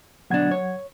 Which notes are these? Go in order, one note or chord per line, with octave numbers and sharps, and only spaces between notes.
D2 B2 F#3 D4 F#5 G#6
C#5